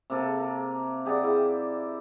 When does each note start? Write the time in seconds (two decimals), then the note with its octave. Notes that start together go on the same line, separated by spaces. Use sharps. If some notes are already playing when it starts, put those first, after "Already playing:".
0.10 C3 A#3 A4
0.39 A#4
1.05 G4 G#4 D5 F#5
1.24 E4 G5